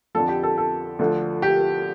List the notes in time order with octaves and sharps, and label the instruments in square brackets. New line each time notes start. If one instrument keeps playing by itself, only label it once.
[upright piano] F2 D3 F3 A4
G4
A4
A4
D2 D3 F3
G4